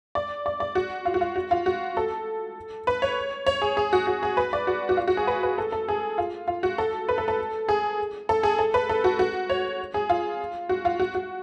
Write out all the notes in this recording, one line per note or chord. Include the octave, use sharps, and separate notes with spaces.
D5
D5
D5
F#4
F4
F#4
F4
F#4
F4
F#4
A4
B4
C#5
C#5
G#4
G#4
F#4
F#4
G#4
B4
D5
F#4
F#4
F4
F#4
G#4
B4
B4
A4
A4
G#4
F4
F4
F#4
A4
B4
A4
A4
G#4
A4
G#4
A4
B4
A4
F#4
F#4
C#5
G#4
F4
F#4
F4
F#4
F#4